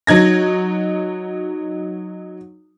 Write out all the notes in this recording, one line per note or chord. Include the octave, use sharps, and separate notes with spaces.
F#3 D#4 G#6 A#6